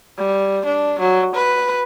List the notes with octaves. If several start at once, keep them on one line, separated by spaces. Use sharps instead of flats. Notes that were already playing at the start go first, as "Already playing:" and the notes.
G3
D4
F#3
B4